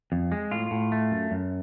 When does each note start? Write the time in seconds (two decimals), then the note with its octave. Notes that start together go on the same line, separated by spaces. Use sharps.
0.12 F2
0.32 G#3
0.51 A2 F4
0.71 A2
0.92 A3
1.11 F#2
1.31 F#2